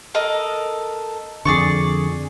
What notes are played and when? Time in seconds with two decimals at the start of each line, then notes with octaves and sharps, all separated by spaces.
0.14 A4 A#4 D#5
1.45 F2 D3 G#4 D5 C#6